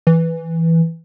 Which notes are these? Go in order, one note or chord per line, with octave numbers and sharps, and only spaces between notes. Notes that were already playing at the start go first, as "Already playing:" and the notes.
E3